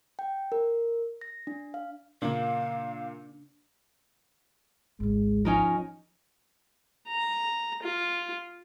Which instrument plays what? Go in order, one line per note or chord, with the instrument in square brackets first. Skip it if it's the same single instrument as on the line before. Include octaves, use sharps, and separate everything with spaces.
[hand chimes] G5
A#4
A#6
D4
F5
[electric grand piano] A#2 A#3 [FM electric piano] C#3 D4 [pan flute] F5
[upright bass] G#1 C#2 [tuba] G#3
[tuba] F3 [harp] C#4 D#4 A#4
[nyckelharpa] A#5
F4